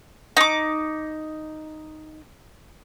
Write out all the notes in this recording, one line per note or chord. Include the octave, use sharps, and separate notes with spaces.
D#4 D6